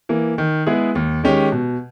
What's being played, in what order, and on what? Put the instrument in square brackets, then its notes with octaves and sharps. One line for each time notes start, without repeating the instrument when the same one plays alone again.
[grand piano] E3 A#3
D#3
G#3 B3 E4 G#4
D#2
D#3 G#3 C#4 G4
B2